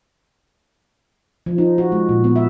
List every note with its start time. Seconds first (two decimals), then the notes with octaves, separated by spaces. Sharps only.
1.46 F3
1.58 D#4
1.78 F#4
1.92 G#3
2.09 A#2
2.24 B3
2.36 E5